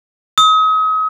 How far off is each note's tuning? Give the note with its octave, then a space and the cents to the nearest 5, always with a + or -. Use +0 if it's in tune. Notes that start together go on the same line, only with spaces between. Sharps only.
D#6 +40